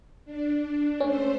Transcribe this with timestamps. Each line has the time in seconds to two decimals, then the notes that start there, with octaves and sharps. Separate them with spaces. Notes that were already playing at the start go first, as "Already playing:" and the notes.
0.25 D4
1.00 A3 C#4 C5